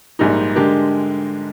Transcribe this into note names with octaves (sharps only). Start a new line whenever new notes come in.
A#1 G#2 G3 A#3 D#4
D3 G#3 D4 G4 A#4